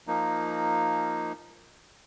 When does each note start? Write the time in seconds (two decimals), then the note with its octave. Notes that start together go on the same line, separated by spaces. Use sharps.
0.07 F3 A#3 D#4